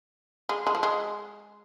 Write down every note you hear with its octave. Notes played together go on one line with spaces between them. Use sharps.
G#3
G#3
F3
G#3